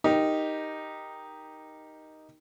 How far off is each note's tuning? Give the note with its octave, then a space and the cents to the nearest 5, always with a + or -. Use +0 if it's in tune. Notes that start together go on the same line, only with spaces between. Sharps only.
D#4 +0 G4 +0 A#4 +0